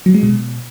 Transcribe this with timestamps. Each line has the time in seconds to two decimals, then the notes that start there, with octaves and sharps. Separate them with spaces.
0.06 F#3
0.14 G#3
0.23 B2